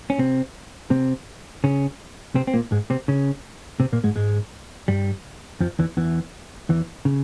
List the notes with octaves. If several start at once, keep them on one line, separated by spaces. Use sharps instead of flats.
C#4
C3 C4
C3 C4
C#3 C#4
C3 C4
C4
A#2 A#3
G#2 G#3
C3 C4
C#3 C#4
C3 C4
A#2 A#3
G#2 G#3
G#2 G#3
G2 G3
F2 F3
E2 E3
E2 E3
E2 E3
C#3